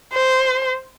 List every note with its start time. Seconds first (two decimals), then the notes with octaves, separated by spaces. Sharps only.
0.13 C5